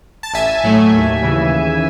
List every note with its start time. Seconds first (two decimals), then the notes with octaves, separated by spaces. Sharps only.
0.23 A5
0.33 A1 E5 G#5
0.64 A2 F#3 A3
0.93 D#2
1.22 C#3 E3